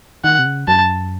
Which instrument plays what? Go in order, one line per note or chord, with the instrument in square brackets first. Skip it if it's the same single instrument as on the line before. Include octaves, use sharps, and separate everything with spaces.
[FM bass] D#3 [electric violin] F#5
[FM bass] C3
C#3
[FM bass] F#2 [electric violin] A5